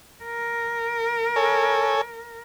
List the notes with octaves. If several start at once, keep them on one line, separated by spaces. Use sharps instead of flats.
A#4
A4 C#5 G#5